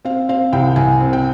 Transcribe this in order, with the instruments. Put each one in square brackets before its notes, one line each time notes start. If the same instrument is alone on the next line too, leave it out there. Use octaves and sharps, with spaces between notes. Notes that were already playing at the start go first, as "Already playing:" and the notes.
[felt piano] C4 F5
C4 F5
C2 G5
C2 G#5
C4
G5